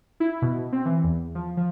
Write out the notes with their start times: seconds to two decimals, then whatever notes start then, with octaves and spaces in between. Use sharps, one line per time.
0.20 E4
0.42 B2
0.72 C4
0.85 E3
1.04 E2
1.35 F3
1.57 F3